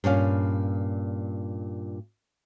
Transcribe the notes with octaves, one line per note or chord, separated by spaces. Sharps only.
G2 A#2 C#4 F5